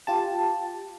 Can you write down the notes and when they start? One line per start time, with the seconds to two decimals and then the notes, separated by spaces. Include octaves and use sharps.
0.07 F4 G4 A5